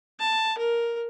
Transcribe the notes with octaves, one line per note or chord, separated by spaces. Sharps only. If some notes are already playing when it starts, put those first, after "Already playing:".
A5
A#4